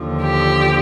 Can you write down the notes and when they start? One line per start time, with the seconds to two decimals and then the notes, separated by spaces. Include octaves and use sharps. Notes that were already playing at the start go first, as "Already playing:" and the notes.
Already playing: D#2 D3 F3
0.22 G4